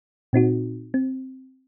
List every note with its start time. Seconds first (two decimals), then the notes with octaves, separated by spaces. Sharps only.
0.33 A#2 C4 D#4 F#4
0.94 C4